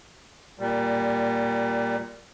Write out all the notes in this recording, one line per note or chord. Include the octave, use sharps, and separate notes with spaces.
A#2 G3